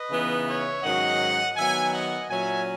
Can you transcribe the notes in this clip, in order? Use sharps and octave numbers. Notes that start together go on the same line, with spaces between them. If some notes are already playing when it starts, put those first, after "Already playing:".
Already playing: B4 D#5
C#3 E3 B3 D#4
C#5 E5
G#2 D#3 F#3 C#4 D#5 F#5
D#3 F#3 B3 E5 G#5
D#5 F#5
A#2 F#3 C#4 E5 G#5